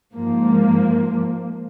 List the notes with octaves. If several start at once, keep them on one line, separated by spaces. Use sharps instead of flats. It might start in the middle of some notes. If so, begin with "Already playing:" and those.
G#2 F3 A#3